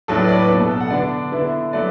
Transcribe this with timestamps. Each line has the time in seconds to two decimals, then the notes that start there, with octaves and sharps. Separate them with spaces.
0.08 A2 F#3 D4 A4
0.18 B4
0.29 D5
0.39 B4
0.50 B2 B3 D4
0.60 A4
0.71 A4
0.80 F#5
0.90 D3 B3 D4 D5
1.32 D3 B3 E4
1.73 F#3 A3 D5